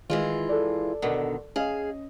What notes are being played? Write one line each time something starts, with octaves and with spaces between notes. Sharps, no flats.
D#3 E3 G#3 F4
A4 D5
B2 D3 D#3
C#4 G#4 D#5 F5